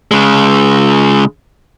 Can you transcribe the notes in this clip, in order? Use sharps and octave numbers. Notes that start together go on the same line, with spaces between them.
C#3 G#3